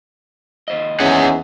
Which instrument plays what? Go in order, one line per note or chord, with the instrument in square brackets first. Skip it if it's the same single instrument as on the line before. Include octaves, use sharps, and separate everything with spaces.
[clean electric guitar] D#2 C5 D#5
[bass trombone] E2 [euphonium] C#4 [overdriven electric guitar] G#4 F#5